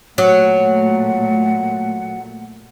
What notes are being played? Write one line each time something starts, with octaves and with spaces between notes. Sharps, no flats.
A#2 F#3 A3 F#5